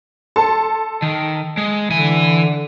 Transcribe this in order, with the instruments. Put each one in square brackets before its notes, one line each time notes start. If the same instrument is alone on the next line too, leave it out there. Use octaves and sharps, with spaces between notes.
[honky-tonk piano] A4 A5 C6
[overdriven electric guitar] D#3
G#3
[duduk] D3 [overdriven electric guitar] E3 G#5